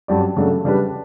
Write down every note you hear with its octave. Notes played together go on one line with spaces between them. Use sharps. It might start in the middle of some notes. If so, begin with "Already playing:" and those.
G2 F#3 C#4 G4 D5
C#3 F#3 A3 D4
C#3 G3 D4 G4 B4